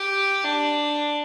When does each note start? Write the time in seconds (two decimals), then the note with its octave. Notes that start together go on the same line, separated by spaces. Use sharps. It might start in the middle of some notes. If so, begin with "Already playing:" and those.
Already playing: G4
0.44 D4